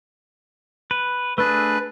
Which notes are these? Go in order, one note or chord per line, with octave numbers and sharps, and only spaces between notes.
B4
A3 D4 G#4 B4